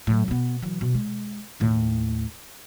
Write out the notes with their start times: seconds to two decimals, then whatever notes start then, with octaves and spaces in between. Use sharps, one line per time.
0.07 A2 F#3
0.28 B2 B3
0.62 E3 F#3
0.81 B2
0.95 G#3
1.60 D#2 A2